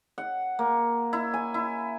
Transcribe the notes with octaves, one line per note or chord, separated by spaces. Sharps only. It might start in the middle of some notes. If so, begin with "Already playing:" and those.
F#5
A#3
E4
G#5
E4